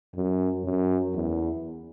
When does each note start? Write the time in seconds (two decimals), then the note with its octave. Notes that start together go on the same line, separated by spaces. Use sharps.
0.15 F#2
0.64 F#2
1.14 E2